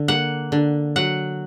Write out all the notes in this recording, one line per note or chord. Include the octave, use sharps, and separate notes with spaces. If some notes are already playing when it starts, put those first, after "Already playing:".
Already playing: D3
A#3 F#5
D3
F#3 F#5